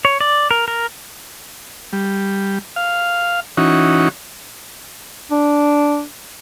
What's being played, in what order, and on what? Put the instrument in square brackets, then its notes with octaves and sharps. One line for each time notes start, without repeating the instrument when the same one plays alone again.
[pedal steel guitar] C#5
D5
A#4
A#4
[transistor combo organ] G3
F5
E3 C#4 D#4 F#4
[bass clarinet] D4